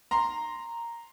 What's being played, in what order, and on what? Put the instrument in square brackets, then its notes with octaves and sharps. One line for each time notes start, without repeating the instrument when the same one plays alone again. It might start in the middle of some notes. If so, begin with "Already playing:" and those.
[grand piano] A#5 C6